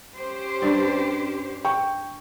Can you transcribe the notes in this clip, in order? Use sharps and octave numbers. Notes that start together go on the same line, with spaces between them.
C#4 G4 C5
G2 G3
G5 C#6